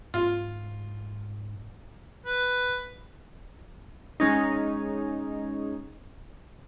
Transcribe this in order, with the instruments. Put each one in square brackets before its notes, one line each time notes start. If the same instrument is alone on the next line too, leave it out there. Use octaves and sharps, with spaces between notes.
[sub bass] G#2 [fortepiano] F4
[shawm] B4
[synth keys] G#3 C#4 D#4